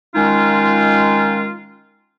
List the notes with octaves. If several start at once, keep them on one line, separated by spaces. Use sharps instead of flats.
D#3 G#3 C#4 D#4 F4